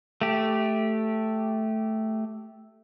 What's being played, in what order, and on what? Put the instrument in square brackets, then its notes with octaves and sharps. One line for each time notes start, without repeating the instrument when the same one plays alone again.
[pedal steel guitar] A3 G4